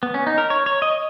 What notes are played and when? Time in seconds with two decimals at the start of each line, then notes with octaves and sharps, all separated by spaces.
0.03 B3
0.14 C#4
0.27 D#4
0.38 A#4
0.50 C#5
0.66 C#5
0.82 D#5